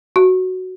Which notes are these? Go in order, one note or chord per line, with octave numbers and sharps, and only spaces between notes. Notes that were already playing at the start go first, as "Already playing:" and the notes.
F#4